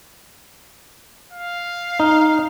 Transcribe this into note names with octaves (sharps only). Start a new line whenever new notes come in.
F5
D#4